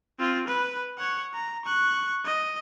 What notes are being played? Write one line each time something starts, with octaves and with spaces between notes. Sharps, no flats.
C4 F4
B4
C#5 F#5
A#5
C#6 F#6
D#5